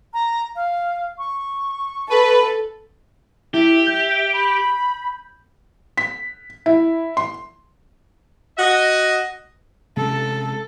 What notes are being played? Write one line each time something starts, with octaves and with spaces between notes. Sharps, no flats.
A#5
F5
C#6
A4 B4
E4 G4 E5
G6
B5
B6
E4
C6
F#4 D#5
C3 G#3 C#4 A4